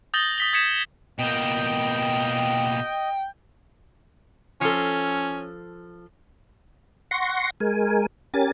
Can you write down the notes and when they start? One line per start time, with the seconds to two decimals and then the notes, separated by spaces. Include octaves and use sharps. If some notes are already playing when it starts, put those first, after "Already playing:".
0.14 D#6 G6 A6 A#6 F#7 G7
0.38 D#6 B6 G7
0.53 D#6 G#6 B6 C#7 E7
1.19 B2 A#3 D#5 G5
4.61 F3 C#4 A4
7.11 F#5 C6 C#6 A#6
7.60 G#3 A#4 G#5
8.34 C#4 G4 A#4 G#5 A6